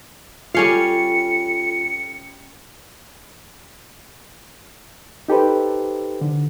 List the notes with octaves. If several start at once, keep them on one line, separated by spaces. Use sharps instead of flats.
G3 C#4 F4 A4 F5 C#7
D#4 G4 A4 B4 C5
D3